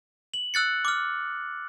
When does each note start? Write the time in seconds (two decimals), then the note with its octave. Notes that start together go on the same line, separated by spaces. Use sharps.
0.34 F#7
0.54 E6 F#6 A6 C#7
0.85 D6 F6